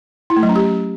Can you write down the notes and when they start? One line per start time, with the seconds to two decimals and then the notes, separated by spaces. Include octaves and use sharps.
0.30 E4
0.36 A3
0.43 F#3
0.49 C#4
0.56 G4